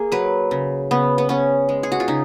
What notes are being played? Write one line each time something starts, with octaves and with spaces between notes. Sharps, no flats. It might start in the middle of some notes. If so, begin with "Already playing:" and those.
Already playing: A#3 G#4
F#3 B4
C#3
C#3 B3
B3
B3 C#4
G#3
G#4
F#4
F4
C#3 D#4